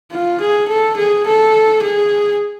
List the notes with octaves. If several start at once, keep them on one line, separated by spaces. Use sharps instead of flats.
F4
G#4
A4
G#4
A4
G#4